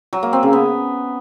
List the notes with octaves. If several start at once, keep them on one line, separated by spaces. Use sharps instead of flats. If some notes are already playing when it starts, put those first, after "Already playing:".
F#3
A#3
C4
C#3
B3